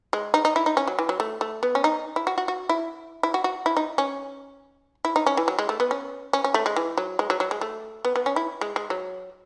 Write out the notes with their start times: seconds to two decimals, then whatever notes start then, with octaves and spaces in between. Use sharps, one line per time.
0.13 G#3
0.34 D#4
0.45 D#4
0.56 E4
0.66 D#4
0.77 C#4
0.87 F#3
0.99 E3
1.09 F#3
1.20 A3
1.41 A3
1.63 B3
1.75 C#4
1.84 D#4
2.16 E4
2.27 F#4
2.38 F#4
2.48 F#4
2.69 E4
3.23 E4
3.34 F#4
3.44 F#4
3.66 E4
3.77 D#4
3.98 C#4
5.05 E4
5.16 D#4
5.26 C#4
5.37 E3
5.48 F#3
5.59 G#3
5.69 A3
5.80 B3
5.91 C#4
6.33 C#4
6.44 C#4
6.54 A3
6.66 G#3
6.76 E3
6.97 F#3
7.19 G#3
7.30 F#3
7.40 F#3
7.51 G#3
7.61 A3
8.05 B3
8.16 B3
8.26 C#4
8.36 E4
8.61 G#3
8.76 G#3
8.90 F#3